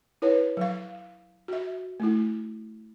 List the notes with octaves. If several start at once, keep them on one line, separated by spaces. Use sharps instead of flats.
E4 B4 C#5
F#3 F5
F#4 E5
A3 E4